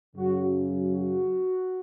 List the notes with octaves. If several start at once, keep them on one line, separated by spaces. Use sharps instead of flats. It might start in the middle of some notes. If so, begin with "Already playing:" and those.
F#2 C#3 F#3 F#4
F#4